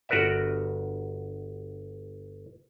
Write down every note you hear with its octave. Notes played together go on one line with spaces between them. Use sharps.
G1 F#4 A#4 B4 D5 E5